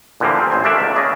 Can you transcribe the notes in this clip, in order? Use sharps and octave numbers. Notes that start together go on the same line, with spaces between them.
A#2 D3 E3 F3 G3 A#3
C4
A1 C5 G#5
A3 A#3 D4 D5 E5
C#2
C#3 G#4 D5 A#5